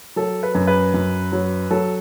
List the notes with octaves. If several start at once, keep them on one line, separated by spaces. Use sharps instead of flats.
F#3 A4
B4
F#2
B4
F#2
F#3
F#3 A4